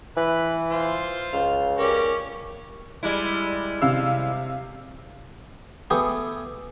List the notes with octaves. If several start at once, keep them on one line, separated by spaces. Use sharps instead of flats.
E3 B4
F4 C5
C#2 F5
C#4 G4 A#4 D5
G3 G#3 E4
C3 F5 E6
A3 B3 G4 G#4 G#5